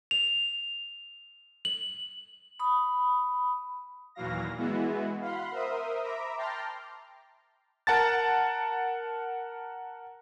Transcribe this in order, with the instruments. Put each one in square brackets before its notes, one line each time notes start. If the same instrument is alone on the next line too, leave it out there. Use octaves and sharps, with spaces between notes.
[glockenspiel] F7
F#7
[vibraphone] B5 D#6
[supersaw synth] D#2 A#2 E3 F#3 F5 A#6
E3 G#3 B3 E4 F#4
F5 F#5 B5 C6
A#4 C5 E5 D#6
E5 A#5 B5 D6
G5 A5 A#5 C6 D6 F6
[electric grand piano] A#4 F#5 A5 A6